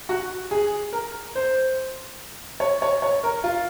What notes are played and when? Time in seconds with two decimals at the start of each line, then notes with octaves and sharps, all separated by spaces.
0.09 F#4
0.51 G#4
0.93 A#4
1.35 C5
2.60 C#5
2.82 C#5
3.02 C#5
3.24 A#4
3.44 F4